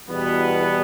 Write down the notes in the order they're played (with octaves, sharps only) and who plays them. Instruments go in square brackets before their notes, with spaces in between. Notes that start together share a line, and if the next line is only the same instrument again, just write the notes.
[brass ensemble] E2 B2 G3 B3